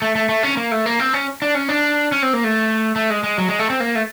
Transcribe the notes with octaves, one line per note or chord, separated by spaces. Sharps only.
A3
A3
A3
C#4
A#3
A3
A#3
C4
C#4
D4
C#4
D4
C#4
C4
A#3
A3
A3
G#3
G#3
F#3
G#3
A3
C4
A#3
A3